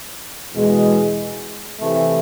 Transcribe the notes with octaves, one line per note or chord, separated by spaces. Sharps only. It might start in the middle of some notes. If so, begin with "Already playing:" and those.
E2 B2 G#3
C3 E3 A3